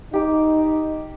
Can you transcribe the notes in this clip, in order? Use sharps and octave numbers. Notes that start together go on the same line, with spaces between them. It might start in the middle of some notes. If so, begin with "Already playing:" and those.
D#4 G4 D6